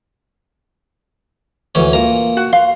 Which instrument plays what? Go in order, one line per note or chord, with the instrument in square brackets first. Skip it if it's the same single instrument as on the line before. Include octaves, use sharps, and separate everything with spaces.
[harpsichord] D2 E3 C#4
A#2 A#5
[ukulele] F#4
[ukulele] F5 [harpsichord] C6